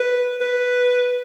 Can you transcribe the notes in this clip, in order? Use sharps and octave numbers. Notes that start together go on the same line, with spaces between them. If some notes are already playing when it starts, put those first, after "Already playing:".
Already playing: B4
B4